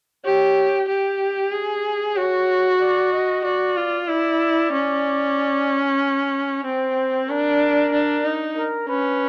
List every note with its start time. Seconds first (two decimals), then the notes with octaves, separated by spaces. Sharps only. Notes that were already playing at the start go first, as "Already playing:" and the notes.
0.25 G4 C#5
0.89 G4
1.52 G#4
2.16 F#4 C#5
2.81 D5
3.13 D#5
3.44 F#4 D5
3.77 F4
4.08 E4 D5
4.72 C#4
6.64 C4 C5
7.29 D4 A#4
7.93 D4
8.25 D#4
8.57 A#4
8.89 C#4 B4